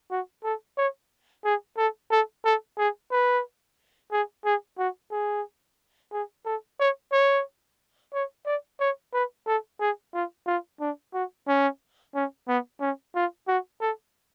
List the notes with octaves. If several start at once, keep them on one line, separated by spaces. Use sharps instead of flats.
F#4
A4
C#5
G#4
A4
A4
A4
G#4
B4
G#4
G#4
F#4
G#4
G#4
A4
C#5
C#5
C#5
D5
C#5
B4
A4
G#4
F4
F4
D4
F#4
C#4
C#4
B3
C#4
F4
F#4
A4